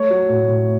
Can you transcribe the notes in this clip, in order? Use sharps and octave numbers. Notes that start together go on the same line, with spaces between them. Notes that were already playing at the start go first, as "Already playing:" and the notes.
Already playing: A3 C#5
F#3
A2
A2